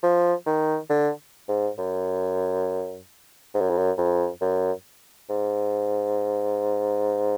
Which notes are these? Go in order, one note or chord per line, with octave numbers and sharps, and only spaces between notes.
F3
D#3
D3
G#2
F#2
G#2
F#2
F2
F#2
F2
F#2
G#2